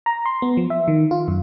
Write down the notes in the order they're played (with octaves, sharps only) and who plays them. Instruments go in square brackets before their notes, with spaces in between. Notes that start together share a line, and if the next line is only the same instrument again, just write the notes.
[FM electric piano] A#5
C6
B3
F3
E5
D#3
F4
F#2